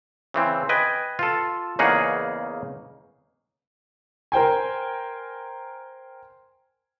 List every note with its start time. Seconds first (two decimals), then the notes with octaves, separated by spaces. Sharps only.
0.34 C#3 E3 C4
0.69 B4 D#5 G5 G#5
1.19 F4 A4
1.79 E2 C#3 A#3 D#4 G#4 F#5
4.32 A#4 C5 G5 G#5